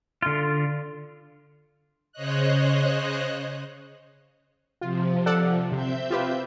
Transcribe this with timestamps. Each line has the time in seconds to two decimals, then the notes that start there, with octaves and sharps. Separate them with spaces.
0.22 D3 F4
2.12 C#3 C5 C#5 D#5 F#6
4.81 C3 F3 F4
5.26 A4 D5 F#5
5.72 C3 C4 E5 G6
6.10 F4 G4 B4